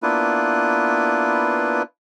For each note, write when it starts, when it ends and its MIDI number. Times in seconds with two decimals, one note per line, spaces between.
0.03 1.82 58
0.03 1.82 59
0.03 1.82 62
0.03 1.82 64
0.03 1.82 65
0.03 1.82 71